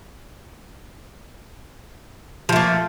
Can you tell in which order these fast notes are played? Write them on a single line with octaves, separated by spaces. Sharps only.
F3 A3 A#3